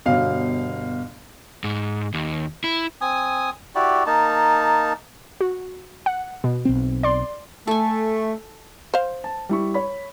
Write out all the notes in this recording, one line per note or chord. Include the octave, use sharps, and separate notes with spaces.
G1 B2 F5
G#2
D#2
E4
C4 G#5 D#6
E4 F#4 G4 D5
A#3 D#4 A5
F#4
F#5
B2
B1 C4
D5 C6
A3 A4 G#5
C5 F5
A5
G3 E4 C#6
C#5 B5